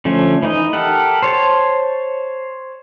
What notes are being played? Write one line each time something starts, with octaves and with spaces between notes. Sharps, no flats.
D3 F3 A3 C#4
E3 D#4 D#5
G4 A4 A#4 F#5
C5 C#5 A5